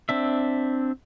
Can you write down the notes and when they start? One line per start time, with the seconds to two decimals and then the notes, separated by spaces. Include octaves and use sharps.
0.09 C4 D4 E5